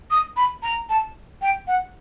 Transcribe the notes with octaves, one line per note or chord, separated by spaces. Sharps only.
D#6
B5
A#5
A5
G5
F#5